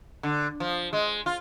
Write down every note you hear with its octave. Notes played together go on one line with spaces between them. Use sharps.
D3
F3
G#3
F4